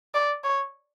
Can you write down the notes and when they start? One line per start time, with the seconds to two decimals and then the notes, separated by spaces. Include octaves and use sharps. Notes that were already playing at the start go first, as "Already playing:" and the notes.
0.14 D5
0.44 C#5